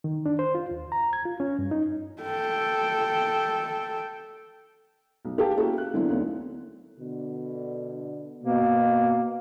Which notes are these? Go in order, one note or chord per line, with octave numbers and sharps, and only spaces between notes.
D#3
D4
C5
F4
D#2
A#5
G#6
F4
C#4
G2
D#4
A4 G5
B1
G4 A4 F5 G5 A5
A#3 C#4 E4 F#4 A4
F#6
D3 E3 F#3 B3 C4 E4
D#2 D3 A3 B3 C#4
B2 D3
B2 A#3